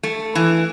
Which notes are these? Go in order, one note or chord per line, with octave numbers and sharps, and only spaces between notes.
A3
E3